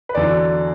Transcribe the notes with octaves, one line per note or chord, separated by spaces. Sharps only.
B4
E2 D3 F#3 D5